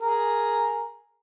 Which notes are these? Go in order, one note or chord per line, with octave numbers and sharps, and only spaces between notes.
G#4 A#4